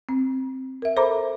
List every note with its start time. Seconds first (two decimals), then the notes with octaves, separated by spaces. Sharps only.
0.09 C4
0.82 A#4 E5
0.96 A4 C5 E5 A#5 B5 D6